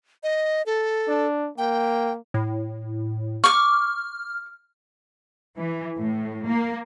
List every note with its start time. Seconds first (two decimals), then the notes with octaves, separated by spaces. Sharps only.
0.23 D#5
0.66 A4
1.08 D4
1.58 A#3 G5
2.34 A2
3.44 C#6 D6 F6
5.57 E3
5.96 A2
6.46 A#3